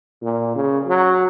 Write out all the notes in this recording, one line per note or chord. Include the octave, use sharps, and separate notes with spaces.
A#2
C#3
F#3